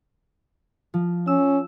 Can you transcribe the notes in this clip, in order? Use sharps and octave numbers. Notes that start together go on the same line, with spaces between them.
F3
C#4 E6